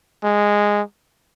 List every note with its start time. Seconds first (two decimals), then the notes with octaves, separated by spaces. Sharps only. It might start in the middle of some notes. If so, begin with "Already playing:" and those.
0.23 G#3